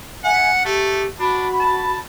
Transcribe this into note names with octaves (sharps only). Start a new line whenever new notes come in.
E5 F#5 G#5
A3 G4
D4 F#4 B5
A5